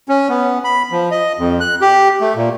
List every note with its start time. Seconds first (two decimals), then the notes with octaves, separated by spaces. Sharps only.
0.09 C#4
0.29 B3
0.64 B5
0.91 F3
1.11 D#5
1.39 F2
1.60 F#6
1.81 G4
2.21 A3
2.35 A#2